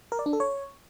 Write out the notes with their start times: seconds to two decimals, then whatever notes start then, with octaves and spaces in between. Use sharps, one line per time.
0.12 A#4
0.19 D5
0.26 D4
0.33 A4
0.40 C#5